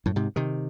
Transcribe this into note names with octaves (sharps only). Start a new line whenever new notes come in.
F#2 A2
G#2 C3
C3 D#3